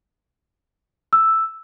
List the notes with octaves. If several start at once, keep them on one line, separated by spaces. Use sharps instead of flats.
E6